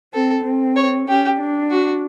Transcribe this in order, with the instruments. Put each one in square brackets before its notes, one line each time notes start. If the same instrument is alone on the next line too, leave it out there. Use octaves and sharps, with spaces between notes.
[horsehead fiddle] C4 [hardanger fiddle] A4
[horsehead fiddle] C4
[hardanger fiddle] C#5
[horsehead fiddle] C#4 [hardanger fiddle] G4
[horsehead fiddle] D4
[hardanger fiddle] F#4